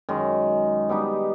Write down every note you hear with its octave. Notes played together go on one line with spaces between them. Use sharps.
F#2 D#3 G#3
G3 B3 D#4 G4